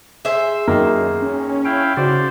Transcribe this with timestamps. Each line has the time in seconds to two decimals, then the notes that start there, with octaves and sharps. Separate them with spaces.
0.25 G#4 C5 E5
0.68 F#2 D#3 A#3
1.22 C#4
1.65 E4 F5 G5
1.97 C#3 F#4 C5 D5